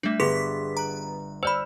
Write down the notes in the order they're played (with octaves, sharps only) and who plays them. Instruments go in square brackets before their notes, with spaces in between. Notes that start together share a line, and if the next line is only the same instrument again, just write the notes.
[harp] G3 E5 [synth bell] A3 D4
[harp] G1 [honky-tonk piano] B3 [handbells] G#4 [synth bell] C6 D6 B6
[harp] B4 D7 [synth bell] A#5
[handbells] C5 D5 B5 [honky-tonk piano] E6